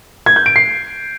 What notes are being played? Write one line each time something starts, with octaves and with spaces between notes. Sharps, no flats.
G#6
G6
D7
C7